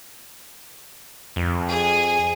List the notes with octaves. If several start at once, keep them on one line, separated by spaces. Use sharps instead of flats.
F2
G#4 G#5